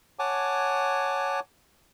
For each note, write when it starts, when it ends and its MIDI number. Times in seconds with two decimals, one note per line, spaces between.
0.19 1.40 73
0.19 1.40 78
0.19 1.40 80
0.19 1.40 81
0.19 1.40 86